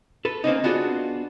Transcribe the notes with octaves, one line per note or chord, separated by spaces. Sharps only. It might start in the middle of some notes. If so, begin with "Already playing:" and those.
A4 B4
A#3 C4 C#4 D#4
B3 D4 F4 F#4 G#4